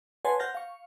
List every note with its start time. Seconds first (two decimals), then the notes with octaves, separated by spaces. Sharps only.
0.25 B4 C#5 F#5 G#5 A5 C6
0.39 C5 F#5 F6 G6 A6 A#6
0.54 F5 C#6